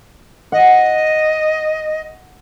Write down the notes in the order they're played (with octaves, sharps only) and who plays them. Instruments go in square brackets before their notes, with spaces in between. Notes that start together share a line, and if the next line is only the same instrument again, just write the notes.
[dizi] D#5 [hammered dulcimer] F#5